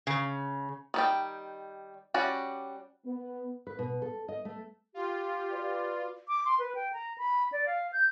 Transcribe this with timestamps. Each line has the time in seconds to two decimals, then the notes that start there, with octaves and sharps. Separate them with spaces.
0.07 C#3
0.94 D#3 G3 G5
2.14 G3 C#4 F#4 D5
3.06 B3
3.67 B4
3.79 B2
4.02 A4
4.28 D#5
4.45 A3
4.94 F4 G4
5.52 F#4 B4 D5
6.28 D6
6.45 C6
6.59 B4
6.75 G5
6.93 A#5
7.18 B5
7.52 D5
7.66 F5
7.93 G6